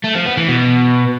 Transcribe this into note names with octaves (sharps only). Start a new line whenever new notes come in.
A3
F3
B3
E3
B2